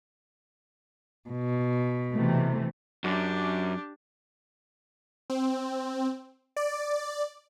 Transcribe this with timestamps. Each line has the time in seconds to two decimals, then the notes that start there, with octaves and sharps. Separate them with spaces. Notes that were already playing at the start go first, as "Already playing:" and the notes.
1.28 B2
2.14 C3 E3 A3
3.04 F#2 D4 G4
5.30 C4
6.57 D5